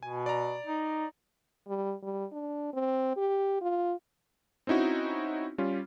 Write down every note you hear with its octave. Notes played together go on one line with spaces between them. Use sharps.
B2 G#5
D5 A#5
D#4
G3
G3
D4
C4
G4
F4
C4 C#4 D#4 E4 F#4
G3 C#4 F4